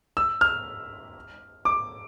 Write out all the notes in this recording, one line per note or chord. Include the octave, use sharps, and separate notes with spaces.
E6
F6
D6